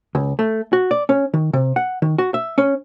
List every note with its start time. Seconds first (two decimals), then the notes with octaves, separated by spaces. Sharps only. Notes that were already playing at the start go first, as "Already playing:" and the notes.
0.15 C#2
0.39 A3
0.73 F#4
0.91 D5
1.09 C#4
1.34 D#3
1.53 C3
1.76 F#5
2.02 D#3
2.18 F#4
2.34 E5
2.58 C#4